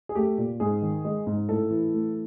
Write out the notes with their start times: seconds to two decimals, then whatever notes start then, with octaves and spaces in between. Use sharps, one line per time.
0.09 G#4
0.15 A3 G4
0.38 A#2
0.60 G#2 G#4
0.82 D#3
1.05 G#3
1.27 G#2
1.49 A2 A4
1.70 E3
1.94 A3